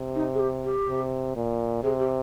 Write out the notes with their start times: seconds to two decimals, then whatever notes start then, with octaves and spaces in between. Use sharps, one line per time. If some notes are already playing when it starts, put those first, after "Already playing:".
Already playing: C3
0.15 D#4
0.34 G#4
0.39 G4
0.64 G4
0.88 C3
1.36 A#2
1.83 C3 G#4
1.99 G4